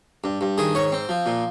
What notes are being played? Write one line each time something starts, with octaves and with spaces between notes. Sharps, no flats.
G2
G2
D#3 G#4
G#2 C#5
C4
F3
A#2